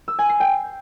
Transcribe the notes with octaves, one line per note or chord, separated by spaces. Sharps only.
E6
G#5
C7
G5